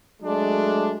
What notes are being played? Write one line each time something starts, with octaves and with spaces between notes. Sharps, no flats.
F#3 G#3 A3 D4